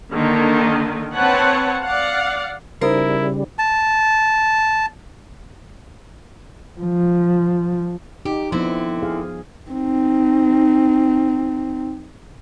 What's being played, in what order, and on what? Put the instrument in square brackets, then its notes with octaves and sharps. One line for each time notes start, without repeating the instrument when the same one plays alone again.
[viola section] D3 D#3 A#3
C4 B4 C#5 F#5 A5
D5 F5 F#5
[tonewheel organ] C#3 G3 [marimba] D#4 C5 [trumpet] E4 [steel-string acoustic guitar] A#4
[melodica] A5
[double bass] F3
[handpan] D#4 [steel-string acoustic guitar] G4
[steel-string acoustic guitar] D3 C4 E4 [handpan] F3 B3
[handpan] G#4 F5
[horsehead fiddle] C4 D#4